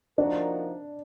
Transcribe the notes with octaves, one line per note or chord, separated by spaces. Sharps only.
F3 A#3 D4 D#4 F#4 A#4